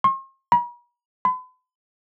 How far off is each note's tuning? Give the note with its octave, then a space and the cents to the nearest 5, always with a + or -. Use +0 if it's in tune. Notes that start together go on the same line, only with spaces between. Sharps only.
C6 +45
B5 -45
B5 +40